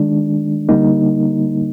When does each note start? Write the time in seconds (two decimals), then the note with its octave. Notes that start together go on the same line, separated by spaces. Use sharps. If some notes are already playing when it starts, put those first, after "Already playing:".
Already playing: D#3 G#3 D4
0.69 D3 G3 A#3 D#4